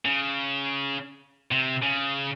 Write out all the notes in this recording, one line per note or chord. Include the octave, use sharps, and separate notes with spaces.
C#3
C3
C#3